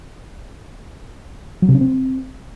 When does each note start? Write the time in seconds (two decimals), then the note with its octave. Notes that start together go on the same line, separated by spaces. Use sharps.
1.62 F#3
1.68 C3
1.75 C#4
1.81 C4